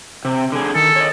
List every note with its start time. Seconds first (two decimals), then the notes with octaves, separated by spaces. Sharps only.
0.25 C3
0.52 D3 G#4
0.75 D#3 A4
0.96 C#5 D#5